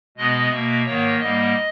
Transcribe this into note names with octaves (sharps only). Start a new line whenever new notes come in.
B2 G#3 B3 D#5
B2 A#3 E5
G#2 D#3 A#3 C#5
G#2 G3 A#3 D#5